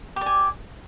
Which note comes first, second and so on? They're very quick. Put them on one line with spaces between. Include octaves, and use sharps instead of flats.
G4 D5 G#5